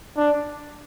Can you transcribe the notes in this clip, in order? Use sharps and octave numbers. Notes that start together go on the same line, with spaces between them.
D4